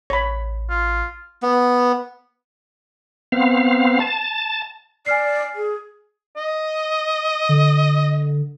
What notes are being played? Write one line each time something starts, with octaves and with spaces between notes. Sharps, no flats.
A1 C#5 B5
F4
B3
B3 C4 F5
A5
D5 G#5 F6 C7
G#4
D#5
D3